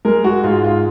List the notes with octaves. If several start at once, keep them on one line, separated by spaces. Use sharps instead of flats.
G#3 A#4
F#4
G#2 F4
F4